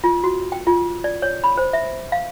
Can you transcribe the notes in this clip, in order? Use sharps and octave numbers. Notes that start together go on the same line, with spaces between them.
F4
F#4
G5
F4
D5
C#5
B5
C5
E5
F5